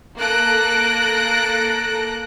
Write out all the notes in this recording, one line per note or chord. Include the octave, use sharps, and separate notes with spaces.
A#3 A4 F#6 A#6 D7